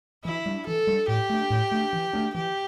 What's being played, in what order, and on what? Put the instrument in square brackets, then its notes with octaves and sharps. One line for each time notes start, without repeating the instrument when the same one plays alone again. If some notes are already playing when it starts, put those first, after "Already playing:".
[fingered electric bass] E3 [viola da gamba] E4
[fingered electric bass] G3 D4
[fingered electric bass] E3 [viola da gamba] A4
[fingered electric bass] G3 D4
[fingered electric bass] A2 [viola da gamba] G4
[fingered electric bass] A3 D4
A2
A3 D4
E3
A3 D4
[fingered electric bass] E3 [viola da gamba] G4